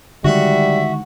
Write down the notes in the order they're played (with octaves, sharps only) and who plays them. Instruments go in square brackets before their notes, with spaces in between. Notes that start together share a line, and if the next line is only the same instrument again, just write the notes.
[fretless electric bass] D3 D#3 G#3 [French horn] G3 [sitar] F#4 [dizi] E5